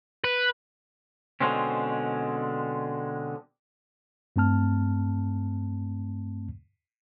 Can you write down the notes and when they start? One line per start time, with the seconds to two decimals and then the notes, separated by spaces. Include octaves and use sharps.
0.24 B4
1.41 B2 D3 G#3 C4 C#4
4.36 G2 A3 C4 A5 F6